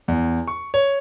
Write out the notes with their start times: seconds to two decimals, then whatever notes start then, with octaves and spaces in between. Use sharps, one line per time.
0.08 E2
0.48 C#6
0.74 C#5